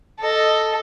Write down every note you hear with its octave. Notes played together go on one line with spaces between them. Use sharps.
A4 D#5